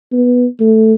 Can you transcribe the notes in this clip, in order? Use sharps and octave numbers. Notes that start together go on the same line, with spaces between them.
B3
A3